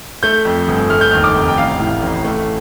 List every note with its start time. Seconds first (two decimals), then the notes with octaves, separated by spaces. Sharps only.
0.23 A3 G6
0.45 F2
0.68 G1
0.90 A3 F6
1.01 G6
1.11 D#2 F6
1.24 D6
1.35 F1
1.49 G5
1.58 A1 F5
1.79 A2
2.02 A1
2.24 A3